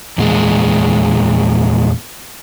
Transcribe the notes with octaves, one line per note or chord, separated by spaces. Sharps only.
E2 A#2 G#3